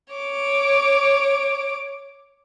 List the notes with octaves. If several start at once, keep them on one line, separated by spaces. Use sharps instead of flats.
C#5 D6